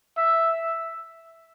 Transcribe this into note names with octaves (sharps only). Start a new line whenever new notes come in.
E5